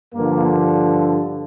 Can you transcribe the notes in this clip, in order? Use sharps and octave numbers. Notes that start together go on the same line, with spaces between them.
G2 D3 F3 A#3